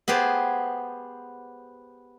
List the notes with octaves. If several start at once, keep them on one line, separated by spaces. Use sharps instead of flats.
B3 G4 G#4 C5 A5